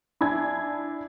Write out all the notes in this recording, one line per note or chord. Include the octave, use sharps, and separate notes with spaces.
D4 E4 G#5 G#6